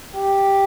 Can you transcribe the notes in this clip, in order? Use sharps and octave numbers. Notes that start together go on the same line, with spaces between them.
G4